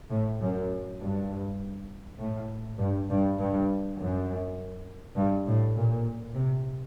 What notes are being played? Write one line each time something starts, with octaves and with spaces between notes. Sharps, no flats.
A2
F#2
G2
A2
G2
G2
G2
F#2
G2
A2
A#2
C3